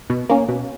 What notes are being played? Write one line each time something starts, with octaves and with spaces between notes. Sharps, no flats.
B2
A#3 C#4
B2